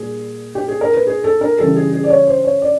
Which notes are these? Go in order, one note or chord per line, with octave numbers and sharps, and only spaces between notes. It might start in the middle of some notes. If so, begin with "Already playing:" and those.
Already playing: A#2 G3 G#4
G4
G#4
A#4
B4
G#4
A4
A#4
C#3 E3 G3 A4
G#4
G#4
D5
C#5
C5
C#5
D5